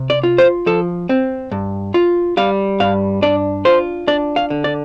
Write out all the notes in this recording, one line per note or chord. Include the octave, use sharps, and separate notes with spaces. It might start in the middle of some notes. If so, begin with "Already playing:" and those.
Already playing: C3
D5
F4
C5
F3 A4
C4
G2
F4
G3 F5
G2 F5
D4 D5
F4 C5
D4 D5
F5
D3
D5